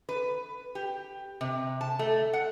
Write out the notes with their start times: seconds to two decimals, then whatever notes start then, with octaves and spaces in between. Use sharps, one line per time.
0.09 B4
0.75 G4
1.41 C3
1.81 A5
1.99 A3
2.33 F#5